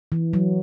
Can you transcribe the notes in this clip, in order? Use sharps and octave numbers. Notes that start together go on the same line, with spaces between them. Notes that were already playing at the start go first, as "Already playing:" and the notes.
E3
F#3